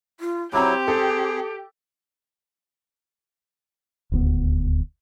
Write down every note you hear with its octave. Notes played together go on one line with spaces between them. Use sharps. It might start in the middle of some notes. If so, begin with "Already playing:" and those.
F4
F#3 C4 E4 G4 A#5 D6
G#4 A4
D#1 D2 B3